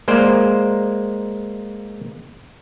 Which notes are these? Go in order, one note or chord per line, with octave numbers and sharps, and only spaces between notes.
G#3 A#3 C5 D5